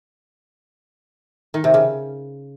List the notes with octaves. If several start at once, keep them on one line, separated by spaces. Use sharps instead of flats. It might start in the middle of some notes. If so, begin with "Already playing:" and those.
D#3
C3
C#3